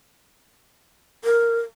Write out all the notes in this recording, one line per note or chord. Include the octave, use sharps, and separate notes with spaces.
A#4